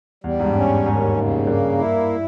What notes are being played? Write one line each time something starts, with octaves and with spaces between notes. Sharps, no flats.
E2 G3
G#2
G2
C#4
G#2
D#2 G#2
C#3
G2 A#3
E4